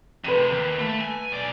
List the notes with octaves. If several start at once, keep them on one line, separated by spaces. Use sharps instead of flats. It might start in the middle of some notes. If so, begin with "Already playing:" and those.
F2 C3 B4 D#7
D#2
A3
G#5
B1 D5